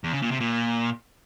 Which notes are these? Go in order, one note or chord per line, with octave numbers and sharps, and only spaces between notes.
E2
C#3
A#2
C3
A#2